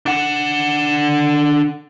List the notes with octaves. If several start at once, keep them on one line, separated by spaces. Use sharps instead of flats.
D4 F#5